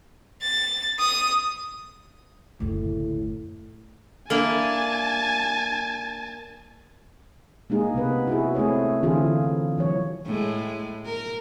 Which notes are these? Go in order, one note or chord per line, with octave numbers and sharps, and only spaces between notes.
A6
D#6
F#1 D2 A2
A#3 D4 E4 G#5 A5
G#3 A#3 D#4 G#4
C3 B3 B4
E4 F#4 G#4
A3 C4 G#4 C#5
D3 E3 C4 F4 G#4
E3 F#3 C#5
A2 G#3
A#4